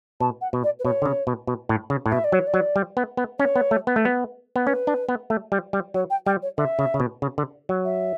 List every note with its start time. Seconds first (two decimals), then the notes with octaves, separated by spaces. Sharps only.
0.20 B2 A5
0.41 F#5
0.53 B2
0.64 D5
0.79 B4
0.85 B2 C#5
1.02 D3
1.06 C#3
1.27 B2
1.47 B2
1.69 A2
1.90 C#3
2.06 A2
2.11 B2 E5
2.24 D5
2.32 F#3
2.35 C#5
2.47 D5
2.54 F#3
2.76 G3
2.97 B3
3.17 B3
3.39 C#4 C#5
3.56 B3
3.71 A3
3.87 B3
3.96 A3
4.05 B3
4.56 B3
4.66 C#4 B4
4.87 D4
5.09 B3
5.30 A3
5.52 G3
5.73 G3
5.94 F#3 C#5
6.10 G5
6.26 G3 G5
6.42 C#5
6.58 D3 E5
6.79 C#3
6.94 C#3
7.00 B2
7.22 C#3
7.38 D3
7.69 F#3
7.85 E5